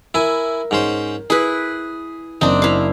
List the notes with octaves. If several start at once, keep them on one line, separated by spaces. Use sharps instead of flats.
E4 A#4 G#5
G#2 C#4 C5
E4 G#4 B4
F#1 C4 D4 D#4
E4 F5